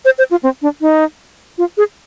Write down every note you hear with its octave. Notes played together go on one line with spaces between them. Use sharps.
C5
C5
F4
C4
D4
D#4
F4
G#4